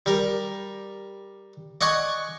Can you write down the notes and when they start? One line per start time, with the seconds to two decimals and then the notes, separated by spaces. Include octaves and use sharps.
0.06 G3 A#4
1.81 D5 D#5 F#5 G#5 C#6